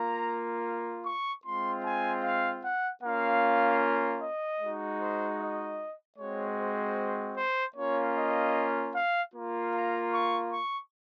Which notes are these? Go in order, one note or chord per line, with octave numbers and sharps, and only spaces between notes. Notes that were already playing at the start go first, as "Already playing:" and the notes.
Already playing: A#3 F4 A#5
C#6
G#3 C4 F4 C6
G#5
F5
F#5
A#3 C#4 F4 F5
D#5
G#3 D#4 F#4
C5
D#5
G#3 C4 F#4 C#5
C5
C5
A#3 C#4 F4 C#5
D#5
F5
A#3 F4
A#5
C#6
C#6